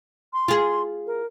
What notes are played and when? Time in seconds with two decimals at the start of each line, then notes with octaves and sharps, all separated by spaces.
0.33 C6
0.48 F4 G#4
1.07 A#4